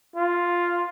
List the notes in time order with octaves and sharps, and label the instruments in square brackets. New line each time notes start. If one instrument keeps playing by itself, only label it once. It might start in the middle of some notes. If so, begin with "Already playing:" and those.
[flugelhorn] F4